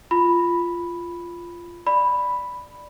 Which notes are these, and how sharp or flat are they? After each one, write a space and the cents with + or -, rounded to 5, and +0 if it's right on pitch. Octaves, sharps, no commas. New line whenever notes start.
F4 -10 B5 +0
D5 +10 B5 +0